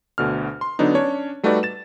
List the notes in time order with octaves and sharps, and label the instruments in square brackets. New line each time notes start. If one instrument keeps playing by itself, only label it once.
[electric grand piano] D2 B2 D3 F6
C6
D3 F#3 B3 D4 D#4
C#4 D4 C#5
G3 A3 D#4 F#4 B4 D5
A6 E7